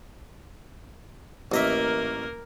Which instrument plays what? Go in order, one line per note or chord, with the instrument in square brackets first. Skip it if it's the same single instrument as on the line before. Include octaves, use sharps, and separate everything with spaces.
[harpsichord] A1 D#5 E5 [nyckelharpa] A#3 A#4